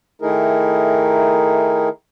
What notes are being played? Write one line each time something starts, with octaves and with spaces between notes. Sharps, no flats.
D#3 A3 D#4 E4 G#4 A#4